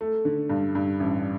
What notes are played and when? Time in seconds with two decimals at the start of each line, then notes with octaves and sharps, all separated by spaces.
0.01 A3
0.25 D3
0.50 G2
0.75 G2
1.00 A1